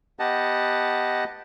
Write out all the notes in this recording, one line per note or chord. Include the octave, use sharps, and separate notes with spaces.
B3 G4 D#5 F#5 A5